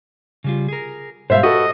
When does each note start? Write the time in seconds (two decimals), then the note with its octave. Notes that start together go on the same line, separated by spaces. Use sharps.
0.44 C#3 G3 F4
0.68 G#4 A#4
1.30 G#2 B2 G3 C5 E5 F5
1.43 F#4 G4 A4 B4 D#5